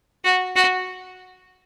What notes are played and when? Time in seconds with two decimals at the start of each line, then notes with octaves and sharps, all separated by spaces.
0.25 F#4
0.56 F#4